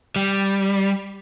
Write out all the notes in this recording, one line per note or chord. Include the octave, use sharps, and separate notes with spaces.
G3